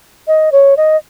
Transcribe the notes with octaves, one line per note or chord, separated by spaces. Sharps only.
D#5
C#5
D#5